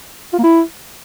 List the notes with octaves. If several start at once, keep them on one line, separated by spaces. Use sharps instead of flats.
F4
A#3
E4